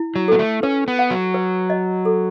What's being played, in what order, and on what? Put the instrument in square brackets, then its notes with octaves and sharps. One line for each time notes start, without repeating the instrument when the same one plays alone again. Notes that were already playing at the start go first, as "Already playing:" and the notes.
Already playing: [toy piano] E4
[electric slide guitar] F#3
[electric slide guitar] B3 [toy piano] A4
[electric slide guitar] A3
[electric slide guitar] C#4 [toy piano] B4
[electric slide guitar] B3
[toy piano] F#5
[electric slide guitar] F#3
[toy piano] B4
D#5
A4